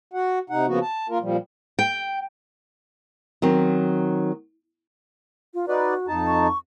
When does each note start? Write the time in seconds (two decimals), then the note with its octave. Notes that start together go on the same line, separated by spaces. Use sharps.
0.13 F#4 F#5
0.50 C3 D#4 F#5
0.67 C#3 F3 A#3 B3 F#4
0.82 A5
1.09 A#3 F4 A#4
1.21 A#2 F3 G3
1.79 G5
3.42 D#3 F#3 C4
5.54 F4
5.68 D#4 F#4 B4 D5
6.08 F2 D#4 A5
6.27 C#6